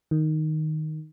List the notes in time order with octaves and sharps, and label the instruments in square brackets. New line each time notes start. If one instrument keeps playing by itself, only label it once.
[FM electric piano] D#3